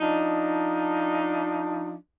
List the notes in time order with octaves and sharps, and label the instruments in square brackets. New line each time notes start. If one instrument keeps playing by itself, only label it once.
[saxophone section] F3 D4 D#4